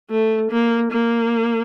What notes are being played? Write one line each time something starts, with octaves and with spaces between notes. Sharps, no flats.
A3
A#3
A#3